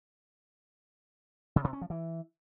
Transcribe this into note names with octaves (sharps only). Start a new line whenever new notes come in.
C#3
C3
C#4
F3
E3